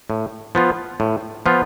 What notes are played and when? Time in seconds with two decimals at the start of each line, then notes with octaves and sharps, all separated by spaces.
0.10 A2
0.55 F3 B3 F4
1.00 A2
1.46 F3 B3 F4